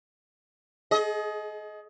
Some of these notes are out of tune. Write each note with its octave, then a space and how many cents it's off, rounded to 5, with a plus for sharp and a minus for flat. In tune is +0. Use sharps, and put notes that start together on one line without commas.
G#4 +45 D#5 +15